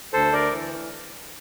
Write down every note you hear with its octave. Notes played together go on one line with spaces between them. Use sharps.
D2 A4 C5
A#4 D5
E3